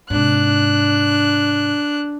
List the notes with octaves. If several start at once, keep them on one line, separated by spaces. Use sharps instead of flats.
G#2 C3 D4 F#6